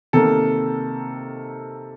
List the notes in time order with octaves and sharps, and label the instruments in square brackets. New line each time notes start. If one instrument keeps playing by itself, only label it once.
[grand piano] C3 D#3 A#3 A4